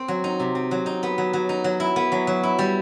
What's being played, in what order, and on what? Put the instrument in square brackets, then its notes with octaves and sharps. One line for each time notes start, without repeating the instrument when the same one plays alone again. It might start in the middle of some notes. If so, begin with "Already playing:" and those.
Already playing: [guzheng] C4
F#3
D#4
C3
C4
F#3
D#4
B3
F#3
F#3
D#4
F#3
E4
B3
F#3
F#3
E4
G3